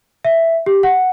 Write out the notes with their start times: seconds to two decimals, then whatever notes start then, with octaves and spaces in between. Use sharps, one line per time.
0.25 E5
0.66 G4
0.83 F#5